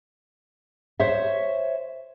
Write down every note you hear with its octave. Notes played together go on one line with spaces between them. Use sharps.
C5 C#5 E5